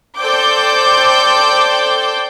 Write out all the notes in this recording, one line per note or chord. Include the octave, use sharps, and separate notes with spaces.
A4 C5 D5 G5 D6 G6